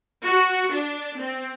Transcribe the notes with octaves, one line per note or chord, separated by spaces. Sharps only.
F#4
D4
C4